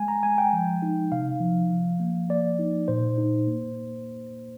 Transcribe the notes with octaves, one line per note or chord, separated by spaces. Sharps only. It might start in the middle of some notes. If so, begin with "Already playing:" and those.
Already playing: G#3 G#5
A#5
G#3 G#5
G5
F3
D#4
C3 F5
F3
F3
A#3
A#3 D5
D#4
A#2 C5
D#4
A#3